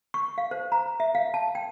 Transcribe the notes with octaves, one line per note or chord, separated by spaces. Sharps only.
C#6
F5
C5
A#5
E5
F5
A5
G5